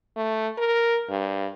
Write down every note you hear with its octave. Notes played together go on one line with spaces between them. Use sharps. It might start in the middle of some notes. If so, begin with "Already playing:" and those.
A3
A#4
G2